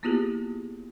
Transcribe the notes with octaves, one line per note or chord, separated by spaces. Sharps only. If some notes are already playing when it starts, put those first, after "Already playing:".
A#3 B3 E4 F4 G4 G#4